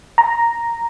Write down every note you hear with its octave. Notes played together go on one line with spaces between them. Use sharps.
A#5